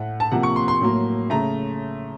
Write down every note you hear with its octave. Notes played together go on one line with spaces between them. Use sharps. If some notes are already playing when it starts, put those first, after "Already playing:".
Already playing: A2 A3 F#5
A5
C3 F3 A#3 F#5
C#6
C6
C6
A2 F#3 A#3
C#3 A3 A#5